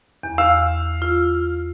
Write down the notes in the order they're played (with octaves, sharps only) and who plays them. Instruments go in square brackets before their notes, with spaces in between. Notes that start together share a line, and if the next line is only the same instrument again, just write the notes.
[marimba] E2
[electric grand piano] F5 E6
[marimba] F4